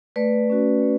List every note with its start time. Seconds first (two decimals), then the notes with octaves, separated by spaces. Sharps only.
0.16 A3 B4 D5
0.50 C#4 F#4
0.82 A3